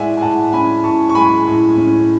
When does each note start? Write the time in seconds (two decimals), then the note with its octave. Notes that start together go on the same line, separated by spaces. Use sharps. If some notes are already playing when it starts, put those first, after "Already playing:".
Already playing: A2 G#3 D5 E5 F#5 G#5
0.17 G#5
0.21 A2 F#5 A5
0.53 C#4 G#5 B5
0.84 A2 A5 C#6
1.09 C#6
1.15 G#3 G#5 B5
1.47 A2
1.78 C#4